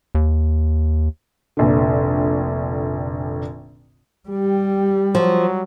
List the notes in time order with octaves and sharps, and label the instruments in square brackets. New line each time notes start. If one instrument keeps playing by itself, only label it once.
[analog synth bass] D#2
[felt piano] F1 A#1 D3
[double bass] G3 [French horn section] G4
[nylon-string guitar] F3 [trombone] F#3